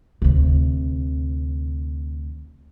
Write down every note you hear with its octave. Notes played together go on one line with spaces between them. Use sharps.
D2 C3